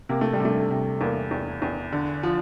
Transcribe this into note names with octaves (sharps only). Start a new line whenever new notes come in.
C3 A#3
A3
G3
C3
A3
C3
E2 A#3
E2
E2
D3
F3